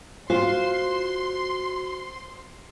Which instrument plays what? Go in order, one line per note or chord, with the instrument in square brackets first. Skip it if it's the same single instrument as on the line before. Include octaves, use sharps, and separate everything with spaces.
[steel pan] F4 [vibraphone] F#4 [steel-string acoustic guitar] C5 [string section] C6